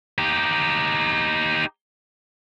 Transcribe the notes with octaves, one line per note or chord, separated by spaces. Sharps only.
D#4 G4